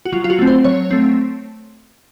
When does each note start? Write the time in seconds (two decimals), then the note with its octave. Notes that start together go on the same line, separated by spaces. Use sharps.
0.05 F#4
0.12 F#3 F4
0.24 F4
0.30 F#4
0.39 A3 C4
0.47 C5
0.64 F#3 C#5
0.91 A3 C4